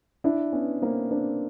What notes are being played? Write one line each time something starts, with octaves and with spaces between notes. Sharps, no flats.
D4 E4
B3 C#4
A#3 C4
C4 D4